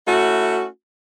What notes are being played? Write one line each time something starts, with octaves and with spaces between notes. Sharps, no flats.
A3 C#4 E4 F#4